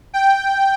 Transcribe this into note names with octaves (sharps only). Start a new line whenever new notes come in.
G5